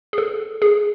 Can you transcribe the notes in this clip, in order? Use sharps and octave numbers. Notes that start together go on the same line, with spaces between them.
G#4
A4
G#4